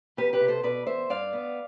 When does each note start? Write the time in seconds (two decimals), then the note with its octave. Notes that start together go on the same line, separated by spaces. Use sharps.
0.17 E2 G4 B4
0.33 G4 B4
0.41 C3
0.48 A4 C5
0.63 B2 B4 D5
0.87 E2 C5 E5
1.09 G2 D5 F5
1.33 B3